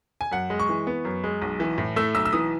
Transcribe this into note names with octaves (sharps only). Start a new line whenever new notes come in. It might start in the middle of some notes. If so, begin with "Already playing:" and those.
G#5
F#2 F#5
G#3
C#6
E3
B3
F#2
G#3
B1
E3
A2
A3 E6
B1 E6
E6
E3 D#6